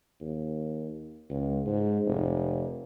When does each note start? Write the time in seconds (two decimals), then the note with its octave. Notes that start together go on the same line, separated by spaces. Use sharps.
0.21 D#2
1.30 C#2
1.66 G#2
2.06 F1